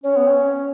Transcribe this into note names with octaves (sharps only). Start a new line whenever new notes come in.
C#4 C#5
B3
C#4